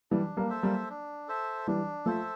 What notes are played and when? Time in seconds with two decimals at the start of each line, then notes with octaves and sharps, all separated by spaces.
0.11 E3 G3 D4
0.37 G3 A#3
0.50 A4 C5 E5
0.63 G3 A#3
0.89 D4
1.28 A4 C5 E5
1.67 E3 G3 D4
2.06 F3 A3 A4 C5 E5